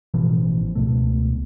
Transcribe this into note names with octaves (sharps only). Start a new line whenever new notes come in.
A1 B2 E3 F3
C#2 B2 A3